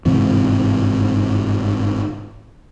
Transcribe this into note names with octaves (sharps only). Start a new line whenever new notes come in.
G1 G#2 C3 E3